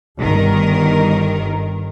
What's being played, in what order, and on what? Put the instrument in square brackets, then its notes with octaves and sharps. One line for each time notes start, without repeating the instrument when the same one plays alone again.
[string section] G1 D#3 A#4